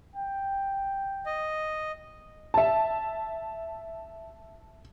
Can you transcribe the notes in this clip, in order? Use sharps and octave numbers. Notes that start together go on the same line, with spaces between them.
G5
D#5
E5 A5